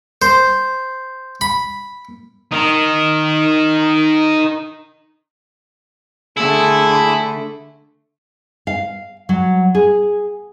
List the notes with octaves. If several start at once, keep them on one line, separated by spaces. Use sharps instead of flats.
C5
B5
D#4 A#4
D3 A3 E4 G#4
F5
F#3
G#4